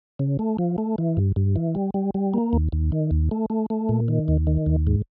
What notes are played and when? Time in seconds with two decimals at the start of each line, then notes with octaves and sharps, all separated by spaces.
0.19 C#3
0.39 A3
0.59 F3
0.78 A3
0.98 E3
1.17 G2
1.36 G2
1.56 E3
1.75 G3
1.94 G3
2.14 G3
2.34 A#3
2.53 D#2
2.72 D#2
2.92 D#3
3.11 D#2
3.31 A3
3.50 A3
3.70 A3
3.89 A#2
4.08 D#3
4.28 D#2
4.47 D#3
4.66 D#2
4.87 G#2